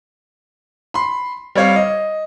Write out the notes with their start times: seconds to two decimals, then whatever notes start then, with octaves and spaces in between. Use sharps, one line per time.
0.94 B5 C6
1.55 G3 C4 C#5 F5
1.76 D#5